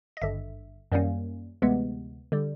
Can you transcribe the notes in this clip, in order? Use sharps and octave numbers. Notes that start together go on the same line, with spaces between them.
D#5
G#1 G2 D3 E5
F#2 D#3 G3 A#3 C#4
D2 C3 E3 G#3 B3
D3 G3